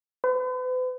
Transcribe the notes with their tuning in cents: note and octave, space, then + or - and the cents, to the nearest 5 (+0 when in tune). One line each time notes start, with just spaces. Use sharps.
B4 +45